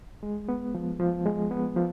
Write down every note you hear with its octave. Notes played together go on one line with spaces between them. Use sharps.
G#3
B3
F3
F3
G#3
B3
F3